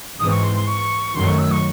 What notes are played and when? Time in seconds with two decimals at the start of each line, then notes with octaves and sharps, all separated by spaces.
0.19 G#2 E3 G#3 C4 D#6
0.30 C#6
0.43 C6
0.55 C6
0.67 C#6
1.15 F#2 D#3 F#3 A3 C6
1.27 C#6
1.38 E6
1.51 C#6